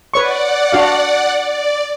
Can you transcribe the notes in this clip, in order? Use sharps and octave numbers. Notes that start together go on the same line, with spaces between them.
B4 C#5 D5 F#5 C#6
D4 F#4 F5
D5